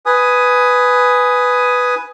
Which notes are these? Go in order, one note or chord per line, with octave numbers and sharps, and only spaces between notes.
B4 G#5 D#6